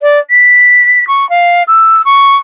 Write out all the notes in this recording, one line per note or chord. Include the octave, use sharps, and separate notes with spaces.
D5
B6
C#6
F5
E6
C#6